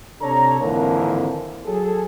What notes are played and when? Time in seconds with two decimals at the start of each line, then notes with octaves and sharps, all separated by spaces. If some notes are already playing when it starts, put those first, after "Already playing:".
0.21 C3 D4 A4 C#5 A#5
0.61 G#1 F2 D3 E3 A#3 A#4
1.66 F#3 G#4 A4